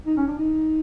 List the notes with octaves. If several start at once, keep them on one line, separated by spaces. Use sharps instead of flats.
D#4
C#4
D4
D#4